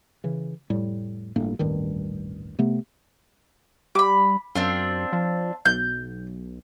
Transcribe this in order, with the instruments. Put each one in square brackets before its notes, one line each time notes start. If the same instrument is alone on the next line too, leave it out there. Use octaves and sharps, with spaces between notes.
[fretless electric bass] C#3 E3
F1 A2 G3
G1 A2 A#3 D4
D#1 A1 G2 D#3
C3 A3 B3
[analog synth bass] G3 [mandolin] B5 D6
[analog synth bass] F#2 [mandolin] C4 D4 F4
[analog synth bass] F3
[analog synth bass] B1 [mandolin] G6